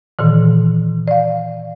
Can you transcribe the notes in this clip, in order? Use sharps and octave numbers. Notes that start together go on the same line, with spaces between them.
A#2 D#3 E3
D5 F5